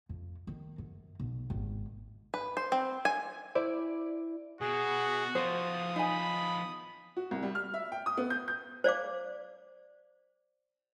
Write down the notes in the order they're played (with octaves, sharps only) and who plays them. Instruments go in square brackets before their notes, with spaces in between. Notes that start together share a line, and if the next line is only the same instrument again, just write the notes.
[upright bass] F2
D#3
F#2
B1
G#1
[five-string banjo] B4
C5
C4
G#5
[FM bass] E4 [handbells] C5 [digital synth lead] D5
[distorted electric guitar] B2 [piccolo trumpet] F#4 [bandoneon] G#4
[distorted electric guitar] F3 B3 [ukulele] C5 [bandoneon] D#6
[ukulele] D#4 G#5 [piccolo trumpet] B5
[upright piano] F#4
C2
G3
F6
E5
G5
D#6
B3
G6
G6
[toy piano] C5 D5 F5 D6